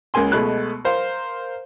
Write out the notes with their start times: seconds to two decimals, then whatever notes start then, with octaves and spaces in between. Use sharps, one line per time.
0.14 C#2 C#3 A#3 G#5 C6
0.32 B2 G#3 A3 B5 F#6
0.85 A#4 C5 F5